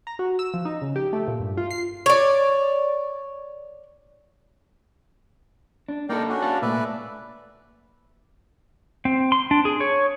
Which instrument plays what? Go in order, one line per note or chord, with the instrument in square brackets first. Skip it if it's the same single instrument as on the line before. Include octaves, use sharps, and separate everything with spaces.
[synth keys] A#5
F#4
E6
F3
D#4
C#3
G4
A3
A#2
G2
F4
C7
[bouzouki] C#5 D5
[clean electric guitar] D4
[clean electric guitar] A#3 D#4 A4 [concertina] A#4 D5 G5
[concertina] C#4 D4 F#4
[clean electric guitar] D5 F5 A5
[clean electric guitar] A#2 A3 [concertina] B4 D5 E5
[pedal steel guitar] C4
C6
D4
G#4
C#5